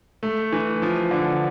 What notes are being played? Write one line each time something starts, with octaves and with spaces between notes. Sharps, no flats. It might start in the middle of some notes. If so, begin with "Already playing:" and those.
A3
E3
F3
D3